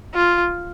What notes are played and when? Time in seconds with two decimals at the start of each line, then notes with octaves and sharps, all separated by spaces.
0.14 F4